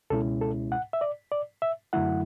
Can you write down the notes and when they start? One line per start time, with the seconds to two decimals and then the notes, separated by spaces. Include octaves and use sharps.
0.10 C#2 B2 G#3 C#4 E4 A4
0.41 A4
0.72 F#5
0.93 E5
1.01 D5
1.32 D5
1.62 E5
1.93 F#2 D3 F#3 A3 E4 F#5